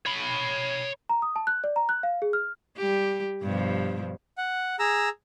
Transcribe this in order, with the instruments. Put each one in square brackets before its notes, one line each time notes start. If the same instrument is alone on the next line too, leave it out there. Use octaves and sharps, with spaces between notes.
[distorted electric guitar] C#5 B5
[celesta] A#5
D#6
A5
F#6
D5
A#5
F#6
F5
G#4
F6
[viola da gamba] G3 G4
G2 B2 F3
[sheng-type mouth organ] F#5
G#4 A#5 E6